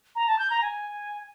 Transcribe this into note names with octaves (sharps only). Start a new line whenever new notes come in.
A#5
A5
G6
A#5
G#5